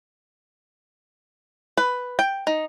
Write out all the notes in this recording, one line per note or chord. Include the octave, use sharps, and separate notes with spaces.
B4
G5
D#4